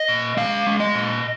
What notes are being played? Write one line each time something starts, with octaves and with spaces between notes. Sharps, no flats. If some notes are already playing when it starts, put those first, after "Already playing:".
Already playing: D#5
A#2
G#3 F5
G#3
D#5
A#2